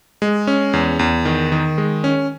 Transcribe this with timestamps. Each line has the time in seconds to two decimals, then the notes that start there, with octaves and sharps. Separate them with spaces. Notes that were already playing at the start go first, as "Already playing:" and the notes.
0.22 G#3
0.47 C#4
0.73 E2
0.99 E2
1.25 D#3
1.52 D#3
1.78 G#3
2.04 C#4